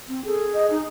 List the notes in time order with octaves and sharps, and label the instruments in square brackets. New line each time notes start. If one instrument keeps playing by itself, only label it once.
[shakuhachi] C4
[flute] G#4 [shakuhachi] A4
[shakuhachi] D#5
D#4